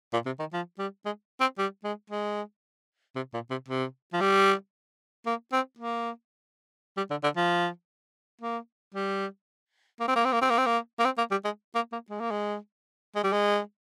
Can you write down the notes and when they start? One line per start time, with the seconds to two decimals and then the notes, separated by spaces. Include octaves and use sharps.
0.13 A#2
0.26 C3
0.40 D#3
0.53 F3
0.79 G3
1.06 G#3
1.40 C4
1.58 G3
1.84 G#3
2.10 G#3
3.16 C3
3.34 A#2
3.51 C3
3.69 C3
4.13 F3
4.21 G3
5.26 A#3
5.52 C4
5.79 A#3
6.97 G3
7.10 D3
7.24 D3
7.37 F3
8.41 A#3
8.94 G3
10.00 A#3
10.08 C4
10.16 A#3
10.25 C4
10.33 A#3
10.42 C4
10.50 A#3
10.58 C4
10.66 A#3
10.99 A#3
11.05 C4
11.18 A#3
11.31 G3
11.45 G#3
11.75 A#3
11.92 A#3
12.10 G#3
12.20 A#3
12.31 G#3
13.15 G#3
13.24 G3
13.33 G#3